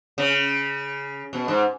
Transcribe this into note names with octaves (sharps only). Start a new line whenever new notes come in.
C#3
B2
G#2